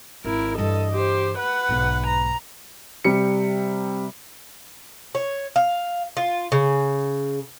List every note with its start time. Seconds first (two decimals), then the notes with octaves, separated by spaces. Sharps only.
0.24 G#1 E4 A#4
0.58 G2 E3 A4 D#5
0.92 G4 C5
1.38 B4 F#5
1.68 B1 G#2
2.07 A#5
3.04 C3 G3 C#7
5.15 C#5
5.56 F5
6.17 F4
6.52 C#3